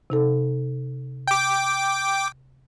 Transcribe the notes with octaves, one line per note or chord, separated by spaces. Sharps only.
C3 D#4 A4
G5 D6